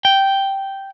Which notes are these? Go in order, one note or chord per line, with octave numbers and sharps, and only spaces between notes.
G5